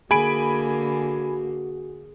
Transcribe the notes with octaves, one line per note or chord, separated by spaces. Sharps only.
D3 A#3 F#4 G#4 G#5 B5 D7